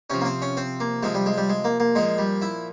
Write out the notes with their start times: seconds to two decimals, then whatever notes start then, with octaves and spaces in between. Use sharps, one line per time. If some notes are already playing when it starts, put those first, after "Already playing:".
0.10 C3 F3 C#4
0.21 A#3
0.25 C4
0.42 C#4
0.57 C4
0.80 A#3
1.03 C3 F3 G#3
1.15 G3
1.26 G#3
1.37 G3
1.49 G#3
1.64 A#3
1.80 A#3
1.95 A#2 F3 G#3
2.18 G3
2.42 E4